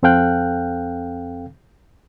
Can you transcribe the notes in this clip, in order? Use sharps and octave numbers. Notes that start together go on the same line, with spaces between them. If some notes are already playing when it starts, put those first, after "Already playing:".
F2 C4 A4 F5 G5 F#6